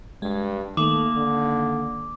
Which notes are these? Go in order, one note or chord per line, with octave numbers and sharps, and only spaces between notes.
G2 G#3
D#3 A3 A#3 D6
D3